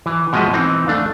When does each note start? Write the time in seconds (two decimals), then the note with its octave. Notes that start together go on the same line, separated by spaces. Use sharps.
0.06 E3
0.33 B2 F3 G#3 D#5 E5
0.53 E3 C4 D#4
0.87 A3 D4 F5